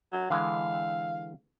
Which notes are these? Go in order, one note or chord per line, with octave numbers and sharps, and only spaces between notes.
F#3
D3 E3 G#3 F5